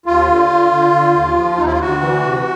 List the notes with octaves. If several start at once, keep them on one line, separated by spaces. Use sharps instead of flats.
D#2 F4
D3
D3
D3
D3
D#2
F3
D#2 D#4
E4
F4
D2 F#4
E3
C3